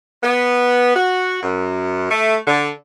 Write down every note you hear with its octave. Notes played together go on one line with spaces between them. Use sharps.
B3
F#4
F#2
A3
D3